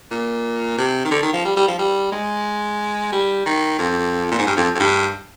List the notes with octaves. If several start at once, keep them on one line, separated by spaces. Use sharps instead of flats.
A#2
C3
D#3
D3
D#3
F3
G3
G3
F3
G3
G#3
G3
D#3
F2
A#2
G#2
G2
F2
F2
G2